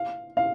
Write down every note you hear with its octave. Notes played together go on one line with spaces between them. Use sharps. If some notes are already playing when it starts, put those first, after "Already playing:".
Already playing: F5
F5